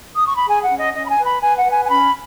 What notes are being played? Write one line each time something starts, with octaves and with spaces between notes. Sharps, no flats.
D#6
C#6
B5
G#4 G#5
F#5
C#4
D#5
C#4 D#5
B5
G#5
B4
B5
B4 G#5
F#5
B4
G#5
G#5
C#4 B5